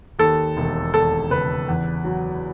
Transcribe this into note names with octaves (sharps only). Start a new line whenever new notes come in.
D#2 A4
E1
E1 A4
C#3 B4
E2
F#3